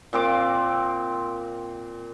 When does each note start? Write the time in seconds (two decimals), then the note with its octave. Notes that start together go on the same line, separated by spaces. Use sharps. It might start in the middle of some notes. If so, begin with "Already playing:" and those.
0.13 A#2 C4 D6